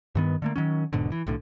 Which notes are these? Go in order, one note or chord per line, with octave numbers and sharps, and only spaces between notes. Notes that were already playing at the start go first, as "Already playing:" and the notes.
G2 D#3 B3
D3 A3 A#3
D#3 F#3 C#4
E1 G#2 B2 D3
E3
B1 A2 D3